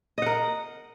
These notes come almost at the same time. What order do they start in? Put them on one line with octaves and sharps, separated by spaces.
D#5 F#5 A#4